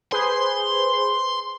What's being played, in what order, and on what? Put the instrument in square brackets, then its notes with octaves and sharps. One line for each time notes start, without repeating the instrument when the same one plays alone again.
[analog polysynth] G#4 B4 C5 [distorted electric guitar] C6